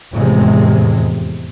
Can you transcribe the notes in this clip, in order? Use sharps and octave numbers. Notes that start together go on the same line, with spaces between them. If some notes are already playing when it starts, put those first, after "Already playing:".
F1 E2 A2 C3 G#3